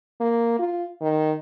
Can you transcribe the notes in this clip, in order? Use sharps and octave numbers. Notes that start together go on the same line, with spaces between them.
A#3
F4
D#3